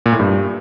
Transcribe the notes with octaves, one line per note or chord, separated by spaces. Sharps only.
A#2
A2
G2